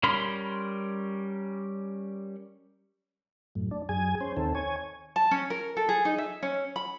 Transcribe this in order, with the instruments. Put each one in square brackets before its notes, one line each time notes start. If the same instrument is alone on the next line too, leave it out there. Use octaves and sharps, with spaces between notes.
[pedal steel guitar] G3 C#4 A#4 B5 C6
[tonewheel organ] F#2 A2
D4
F#2 G#4 G#5
C#4 C5
D#2 D#3 C4 A4
C#5 G#5
[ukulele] A5
C#4
A#4
A4
G#4
D#4
E5
C#4
B5